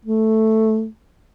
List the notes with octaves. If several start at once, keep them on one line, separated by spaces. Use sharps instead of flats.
A3